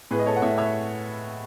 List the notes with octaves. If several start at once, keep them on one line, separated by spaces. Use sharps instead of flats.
A2 G#4 B4
D#5
A4 C#5
F#5
A2 C#5 E5
C#5 E5